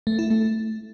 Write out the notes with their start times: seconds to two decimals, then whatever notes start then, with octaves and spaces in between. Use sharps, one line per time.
0.07 A3
0.19 E4
0.30 A3